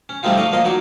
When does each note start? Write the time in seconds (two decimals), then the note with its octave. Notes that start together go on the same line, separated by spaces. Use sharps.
0.09 C#4
0.23 F3 G3 A3 C4 D#4 F4
0.37 D5 D#5 F5 C#6
0.52 F3 A#3 D#5 C6
0.65 F#3 D#4 C#5 D5